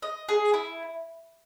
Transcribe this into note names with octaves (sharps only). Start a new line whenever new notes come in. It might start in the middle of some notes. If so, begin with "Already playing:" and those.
D#5
G#4
E4